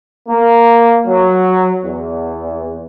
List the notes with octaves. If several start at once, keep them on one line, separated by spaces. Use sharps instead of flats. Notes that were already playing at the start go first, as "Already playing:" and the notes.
A#3
F#3
E2